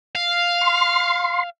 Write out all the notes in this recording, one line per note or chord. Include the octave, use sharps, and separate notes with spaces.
F5
C6